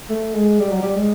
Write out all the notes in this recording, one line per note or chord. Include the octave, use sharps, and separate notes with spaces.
A3
G#3
G3
F#3
G3
G#3